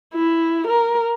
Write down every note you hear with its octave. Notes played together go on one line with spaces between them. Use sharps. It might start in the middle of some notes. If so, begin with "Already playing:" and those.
E4
A#4